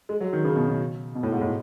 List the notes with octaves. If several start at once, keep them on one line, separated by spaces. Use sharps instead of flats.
G#3
F#3
D#3
C#3
B2
B2
B2
A2
G#2
A2